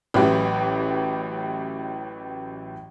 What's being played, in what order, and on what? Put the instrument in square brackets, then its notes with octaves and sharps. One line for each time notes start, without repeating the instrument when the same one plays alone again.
[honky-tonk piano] A1 A2 E3 F#3 F#4 G4